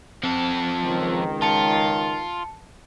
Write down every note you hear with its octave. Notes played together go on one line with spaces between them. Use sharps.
F3 C4 A4
C#2 D#3
F4 A5 C#7